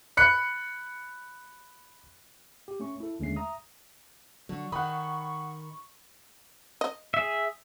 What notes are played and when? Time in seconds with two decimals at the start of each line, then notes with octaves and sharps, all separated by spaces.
0.17 B5 F#6 C#7
2.68 G4
2.80 A3 C#4 C#6
3.00 E4 A4
3.20 D#2 D3 G#3 A3 C#4 C7
3.36 E5 A#5 D#6
4.49 D3 F#3 C#6
4.72 D#3 F#5 G5 B5 D#6
6.81 D#5
7.14 G#4 E5